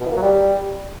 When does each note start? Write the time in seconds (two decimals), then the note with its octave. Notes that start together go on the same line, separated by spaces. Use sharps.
0.01 B2
0.06 E3
0.11 A#3
0.17 F#3
0.22 G3